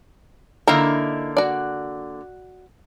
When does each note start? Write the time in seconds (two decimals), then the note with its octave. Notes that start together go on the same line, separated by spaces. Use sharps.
0.68 D3 A#3 D#4 E4 A#4 A#5
1.37 F#4 D5